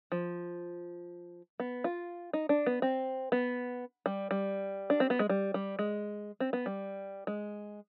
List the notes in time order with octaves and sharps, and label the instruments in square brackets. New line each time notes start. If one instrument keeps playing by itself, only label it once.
[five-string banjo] F3
B3
F4
D#4
D4
B3
C4
B3
G3
G3
D4
C4
B3
G#3
G3
G3
G#3
C4
B3
G3
G#3